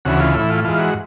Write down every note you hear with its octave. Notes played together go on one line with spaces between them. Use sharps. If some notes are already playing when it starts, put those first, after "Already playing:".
D2 C#3 E3 F#4
F4
A2 E3 E4
F4
G#2 E3 F4
F#4